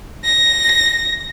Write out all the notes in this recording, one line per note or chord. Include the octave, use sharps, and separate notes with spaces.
A#6